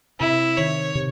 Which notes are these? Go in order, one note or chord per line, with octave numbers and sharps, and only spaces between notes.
C3 E4
D#3 C#5
C3